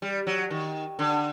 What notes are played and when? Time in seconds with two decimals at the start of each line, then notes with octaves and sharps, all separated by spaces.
0.02 G3
0.27 F#3
0.50 D#3
0.99 D3